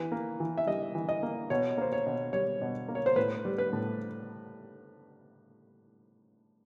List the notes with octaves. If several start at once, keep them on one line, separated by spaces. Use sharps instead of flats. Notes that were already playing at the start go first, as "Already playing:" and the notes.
Already playing: E3 B4
A#3
E3
E5
G3 D#5
E3
D#5
A#3
B2 C#5
A#3 C5
C#5
B2
G3 C#5
B2
A#3
C#5
C5
A2 B4
G3
B4
A2